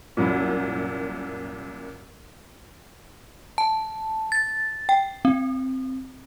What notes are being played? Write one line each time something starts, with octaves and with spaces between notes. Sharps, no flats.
C2 F#2 A#2
A5
A6
G5
C4